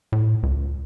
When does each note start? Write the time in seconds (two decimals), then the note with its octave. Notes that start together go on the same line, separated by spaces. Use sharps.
0.12 A2
0.43 C#2